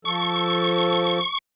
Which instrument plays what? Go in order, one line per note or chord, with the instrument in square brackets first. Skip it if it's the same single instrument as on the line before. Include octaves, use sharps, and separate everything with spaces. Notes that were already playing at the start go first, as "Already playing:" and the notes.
[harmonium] F3 A4 [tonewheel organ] C#6